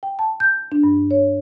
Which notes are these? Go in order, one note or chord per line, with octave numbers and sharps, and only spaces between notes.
G5
A5
G6
D4
G2
C#5